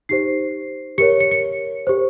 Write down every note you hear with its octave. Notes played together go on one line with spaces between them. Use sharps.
D#4 G4 C5 C7
G4 A#4 C#5 C#7
C#7
C#7
G4 C5